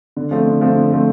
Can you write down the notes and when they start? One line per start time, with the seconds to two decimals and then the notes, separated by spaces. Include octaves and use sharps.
0.17 D3
0.31 F3 A3 C4
0.47 D3
0.61 F3 A3 C4
0.76 D3
0.91 F3 A3 C4